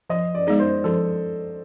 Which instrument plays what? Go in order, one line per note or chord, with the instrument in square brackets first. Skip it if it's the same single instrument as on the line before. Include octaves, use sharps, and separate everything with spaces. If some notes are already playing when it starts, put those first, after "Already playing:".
[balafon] F3 [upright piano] D#5
[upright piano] D5
[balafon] G#3 B3 D#4 G#4
[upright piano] C5
[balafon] F3 [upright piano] A4